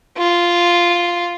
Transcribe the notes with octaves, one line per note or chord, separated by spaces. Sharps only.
F4